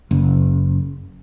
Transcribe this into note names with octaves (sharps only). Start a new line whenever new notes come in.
F#1